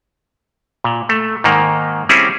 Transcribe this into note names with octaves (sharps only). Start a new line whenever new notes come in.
A#2
A3
G#2 D#3 A#3
G3 C4 C#4 E4 G#4